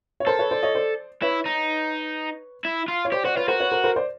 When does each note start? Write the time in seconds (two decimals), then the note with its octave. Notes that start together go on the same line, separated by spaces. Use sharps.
0.20 C#5
0.27 A4 A#4 C5
0.39 B4 C#5
0.51 C5 D5
0.63 C#5 D#5
0.75 C5 D5
1.22 E4 B4 C#5
1.46 D#4
2.65 E4
2.88 F4
3.05 C#5
3.12 G4 C5 D5
3.24 F#4 C5 D5
3.36 F4 B4 C#5
3.48 F#4 A#4 C5
3.60 B4 C#5
3.72 A#4 C5
3.84 A#4 C5
3.96 C5 D5